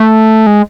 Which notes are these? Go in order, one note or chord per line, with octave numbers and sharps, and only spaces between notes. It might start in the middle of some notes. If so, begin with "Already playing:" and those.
Already playing: A3
G#3